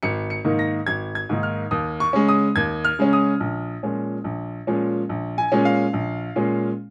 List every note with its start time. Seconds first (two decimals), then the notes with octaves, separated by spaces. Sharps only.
0.03 G#1 C#7
0.30 C#7
0.44 G#2 D#3 A#3 D#4
0.59 A#6
0.87 G#1 G#6
1.15 G#6
1.29 G#2 D#3 A#3 D#4
1.43 F6
1.71 D#2 D#6
2.00 C#6
2.13 C#3 G#3 C#4
2.28 D#6
2.56 D#2 G#6
2.85 F6
2.99 C#3 G#3 C#4
3.13 D#6
3.40 A#1
3.83 A#2 F3 G#3 C#4
4.24 A#1
4.67 A#2 F3 G#3 C#4
5.09 A#1
5.38 G#5
5.52 A#2 G#3 C#4
5.65 F5
5.93 A#1
6.36 A#2 G#3 C#4